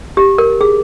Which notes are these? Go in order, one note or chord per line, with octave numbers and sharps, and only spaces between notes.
G4
A#4
G#4